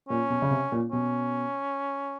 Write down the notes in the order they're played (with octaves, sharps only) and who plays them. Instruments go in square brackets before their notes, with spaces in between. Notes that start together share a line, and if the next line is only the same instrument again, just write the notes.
[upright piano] A#2 [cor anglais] C#4
[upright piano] B2
C#3
C3
A#2
[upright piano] B2 [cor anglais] C#4